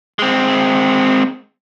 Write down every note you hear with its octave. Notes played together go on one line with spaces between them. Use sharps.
G#3 C4